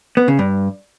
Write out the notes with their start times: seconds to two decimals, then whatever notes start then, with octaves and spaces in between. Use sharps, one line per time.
0.17 B3
0.28 C#3
0.39 G2